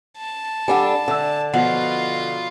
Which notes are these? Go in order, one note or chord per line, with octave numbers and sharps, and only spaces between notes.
A5
G3 D4 A4 F#5 G#5
D3 E5 E6
B2 F3 F4 F5 F#5